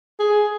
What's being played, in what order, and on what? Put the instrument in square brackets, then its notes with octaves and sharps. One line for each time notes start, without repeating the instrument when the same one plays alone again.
[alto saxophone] G#4